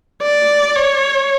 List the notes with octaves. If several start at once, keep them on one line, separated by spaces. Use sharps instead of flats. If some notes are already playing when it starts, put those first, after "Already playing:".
D5
C#5